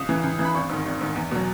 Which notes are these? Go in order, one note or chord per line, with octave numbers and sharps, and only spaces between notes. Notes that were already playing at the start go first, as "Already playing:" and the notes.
Already playing: C#2 D#6
C#3 E3
C#2
C#3 E3
B5
G#1 C#6
G#2 D#3
G#1
G#2 D#3
E2
B2 F#3